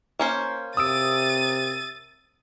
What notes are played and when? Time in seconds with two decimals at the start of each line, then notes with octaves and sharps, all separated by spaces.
0.19 A#3 C#4 C5
0.77 C3 D#6 E6 A6 D7 D#7